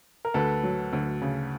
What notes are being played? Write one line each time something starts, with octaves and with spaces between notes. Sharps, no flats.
A#4
D2 A4 B4
F#3
D2
C#3